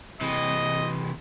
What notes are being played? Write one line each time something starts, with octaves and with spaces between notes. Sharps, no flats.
C3 E3 D#5